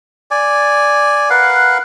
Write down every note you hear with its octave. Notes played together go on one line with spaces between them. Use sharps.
D5 G#5
A#4 B4 F5 F#5